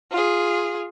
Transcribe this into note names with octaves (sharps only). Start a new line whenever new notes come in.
F4 G#4